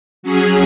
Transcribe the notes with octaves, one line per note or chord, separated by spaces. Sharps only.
F#3 C#4 G#4